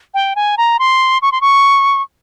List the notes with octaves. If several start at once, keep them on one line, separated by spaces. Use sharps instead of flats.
G5
G#5
A#5
C6
C#6
C6
C#6